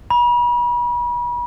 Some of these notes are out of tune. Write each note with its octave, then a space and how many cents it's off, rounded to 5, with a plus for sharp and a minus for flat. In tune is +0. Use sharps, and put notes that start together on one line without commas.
B5 -40